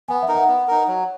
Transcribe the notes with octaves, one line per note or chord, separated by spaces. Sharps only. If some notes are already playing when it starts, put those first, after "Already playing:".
B3 G#5
E5
D#4 A#4
F#5
B3
D#4 A#4
F#3